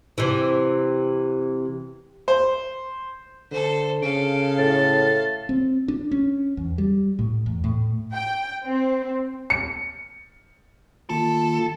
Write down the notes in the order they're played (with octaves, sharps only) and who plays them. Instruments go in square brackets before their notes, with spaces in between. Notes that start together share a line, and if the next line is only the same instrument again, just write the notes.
[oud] C3 E3
[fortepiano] C5
[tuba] D3 [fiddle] A4 C5
[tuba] C#3 [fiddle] A4 F5 [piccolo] D7
[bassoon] A2 [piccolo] A6
[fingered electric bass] C4
D4
C#4
E2
G3
A2
E2
A2
[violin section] G5
C4
[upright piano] C#7
[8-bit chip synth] D#3 A#3 F4 [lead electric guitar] A4